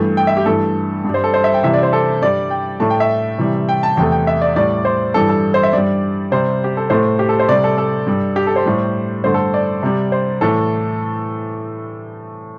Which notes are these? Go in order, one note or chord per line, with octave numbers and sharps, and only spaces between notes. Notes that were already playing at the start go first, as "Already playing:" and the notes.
Already playing: G2 E3 A3
G5
E5
G4
G2 E3 A3 A4
G2 G3
C5
A4
C5
E5
G5
C3 E3 G3 E5
D5
C5
A4
G2 G3 D5
G5
A2 A3 A5
G5
E5
C3 E3 G3
G5
A5
E2 C3 A3 G5
G5
E5
D5
A2 G3 D5
C5
G2 E3 G3 A4
A4
C5
E5
G2 G3 D5
C3 G3 C5
G4
A4
A2 A3 C5
G4
A4
C5
C3 G3 D5
A4
A4
G2 G3
G4
A4
C5
A2 G3
G2 D3 A3 C5
A4
D5
C3 G3
C5
A2 E3 A3 A4